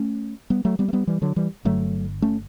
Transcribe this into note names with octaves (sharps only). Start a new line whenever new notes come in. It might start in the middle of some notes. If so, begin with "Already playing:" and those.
Already playing: A3 C#4
G3 B3
F#3 A3
G3 B3
A3
G3 B3
E3 G3
D3 F#3
E3 G3
G1 G2 D3 F#3 A3
A3 C#4